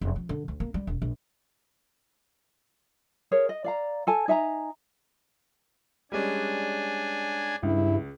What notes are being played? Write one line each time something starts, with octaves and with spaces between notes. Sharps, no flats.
F1
F3
D3
D2
A#3
G3
E1
A#1
G#4 A#4 C#5
D#5
D5 F5 A#5
A4 G#5 A5
D#4 E5 G#5 A#5
G3 G#3 C#4 D4 G#5
C#2 G2 E4